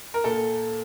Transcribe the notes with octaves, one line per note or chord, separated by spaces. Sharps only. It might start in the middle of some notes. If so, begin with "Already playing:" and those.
A#4
A#2 A4